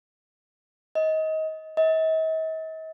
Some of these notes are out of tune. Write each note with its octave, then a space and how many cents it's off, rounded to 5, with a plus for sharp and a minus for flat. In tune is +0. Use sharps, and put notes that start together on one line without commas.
D#5 +20
D#5 +45